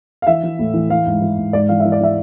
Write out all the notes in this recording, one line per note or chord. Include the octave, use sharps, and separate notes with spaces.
F5
E3 E5
E3
A2
E3
E3 F5
G#2
E3
G#2
G#2 D5
E3 F5
E5
E3
D5
E3 E5